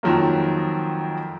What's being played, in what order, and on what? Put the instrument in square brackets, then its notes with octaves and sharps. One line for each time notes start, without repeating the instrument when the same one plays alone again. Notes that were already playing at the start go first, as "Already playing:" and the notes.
[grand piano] F2 D#3 F3 F#3 A#3